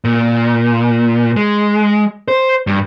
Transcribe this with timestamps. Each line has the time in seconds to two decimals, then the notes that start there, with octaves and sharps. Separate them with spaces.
0.04 A#2
1.37 G#3
2.28 C5
2.67 G2